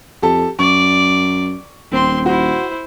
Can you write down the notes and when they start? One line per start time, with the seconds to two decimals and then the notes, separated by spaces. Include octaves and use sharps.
0.22 F2 G4 A4 A5
0.59 F#2 D5 C#6
1.91 D#1 C4 C6
2.26 E4 F#4 C5